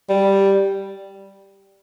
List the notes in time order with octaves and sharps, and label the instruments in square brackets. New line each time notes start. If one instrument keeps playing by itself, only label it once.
[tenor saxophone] G3